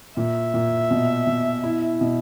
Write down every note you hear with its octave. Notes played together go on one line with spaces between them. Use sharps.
A#2 E5
A#2
B2
B2
E4
B2